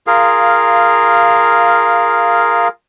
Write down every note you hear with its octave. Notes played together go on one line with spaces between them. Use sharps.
F4 G#4 A#4 F5